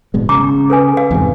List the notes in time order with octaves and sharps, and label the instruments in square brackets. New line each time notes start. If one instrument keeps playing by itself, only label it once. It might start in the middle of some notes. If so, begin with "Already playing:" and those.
[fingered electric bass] G#1 B2 G#3
[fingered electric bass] C#3 [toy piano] A#5 D6
[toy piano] A4 B4 G#5
F5
[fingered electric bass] E2 G#2 C3